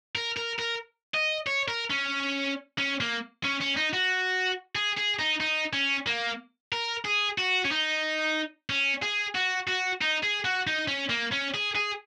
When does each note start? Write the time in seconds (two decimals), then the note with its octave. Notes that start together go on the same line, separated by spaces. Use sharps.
0.15 A#4
0.37 A#4
0.59 A#4
1.14 D#5
1.47 C#5
1.68 A#4
1.90 C#4
2.78 C#4
3.01 A#3
3.44 C#4
3.61 C#4
3.77 D#4
3.93 F#4
4.75 G#4
4.97 G#4
5.19 D#4
5.41 D#4
5.73 C#4
6.07 A#3
6.73 A#4
7.05 G#4
7.38 F#4
7.65 C#4
7.71 D#4
8.70 C#4
9.02 G#4
9.35 F#4
9.68 F#4
10.01 D#4
10.23 G#4
10.45 F#4
10.67 D#4
10.88 C#4
11.10 A#3
11.32 C#4
11.55 G#4
11.75 G#4